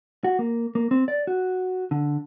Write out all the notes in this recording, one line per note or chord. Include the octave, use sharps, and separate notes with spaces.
F#4
A#3
A#3
C4
D5
F#4
D3